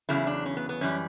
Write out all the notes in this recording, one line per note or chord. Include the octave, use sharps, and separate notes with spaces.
E2 C#3 F#3 E4
D4
C#4
B3
B3
F#2 E3 G3 C#4